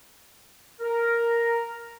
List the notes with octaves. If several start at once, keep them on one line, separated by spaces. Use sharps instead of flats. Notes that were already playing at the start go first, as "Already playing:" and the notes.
A#4